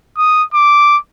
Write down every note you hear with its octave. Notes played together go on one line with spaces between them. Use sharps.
D#6
D6